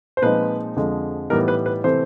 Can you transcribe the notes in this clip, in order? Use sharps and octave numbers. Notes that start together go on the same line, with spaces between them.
C5
A#2 F3 G#3 C4 D#4 B4
F2 D3 F3 G#3
A2 E3 G3 B3 D#4 A#4
B4
B4
C3 E3 A3 C4 C5